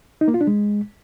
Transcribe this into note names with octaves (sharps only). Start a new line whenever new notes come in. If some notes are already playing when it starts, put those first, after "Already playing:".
D#4
A#3
F4
D4
G#3